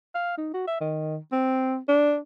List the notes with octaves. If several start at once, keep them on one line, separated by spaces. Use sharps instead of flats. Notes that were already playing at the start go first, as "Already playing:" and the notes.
F5
D#4
F#4
E5
D#3
C4
D4